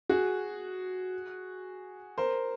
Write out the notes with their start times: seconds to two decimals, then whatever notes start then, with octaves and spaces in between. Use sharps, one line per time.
0.09 F#4 G#4
2.18 A#4 C5